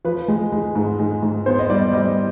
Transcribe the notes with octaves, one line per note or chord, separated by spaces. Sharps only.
F3 B4
G#3
G#3
G#2
G#3
G#2
B3 C5
D#5
G3 D5
G3 D#5